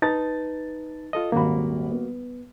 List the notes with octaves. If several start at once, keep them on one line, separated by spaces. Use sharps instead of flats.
D#4 B4 A5 A6
F4 A4 D#5
D#1 G#1 A#3 F#4 B5
B3